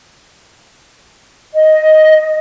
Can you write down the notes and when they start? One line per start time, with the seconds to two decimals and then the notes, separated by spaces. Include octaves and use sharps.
1.54 D#5